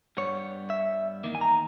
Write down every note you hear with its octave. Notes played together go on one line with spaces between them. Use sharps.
G2 G3 B3 C#5
E5
E2 D#3 A#3 D#4
G#5
A#5